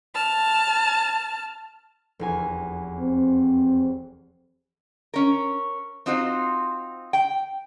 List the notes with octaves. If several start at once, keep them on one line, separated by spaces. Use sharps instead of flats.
A5 F6
F1 E2 G#5
C4
C#4 A#4
C4 D#4 F4 F#4 C5
G5